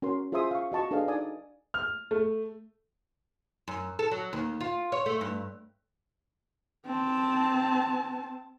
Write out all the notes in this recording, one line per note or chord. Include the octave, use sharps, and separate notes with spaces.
C#4 F#4 A#4 C6
F4 G#4 C5 E5 C6 D#6
F5 C#6
F#4 D#5 A5 C#6
D4 G#4 A4 B4 D#5 F5
D#4 D5 G#5 D#6
F6
A3
F#2
A4
F#3
D#2
F4
C#5
A3
G2
C4 A5